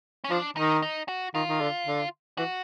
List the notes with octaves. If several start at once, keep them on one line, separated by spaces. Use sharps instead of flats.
C#4
F3 D4
D#3 D#4
D#4
F#4
D#3 F4
D#3
D3
D3
E3 F#4